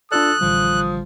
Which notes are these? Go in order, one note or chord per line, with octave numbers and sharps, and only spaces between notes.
D4 F4 A4 D5 D#6 F#6
A1 D3 F3 G3